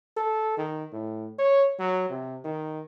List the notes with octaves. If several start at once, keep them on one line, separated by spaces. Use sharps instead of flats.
A4
D#3
A2
C#5
F#3
C3
D#3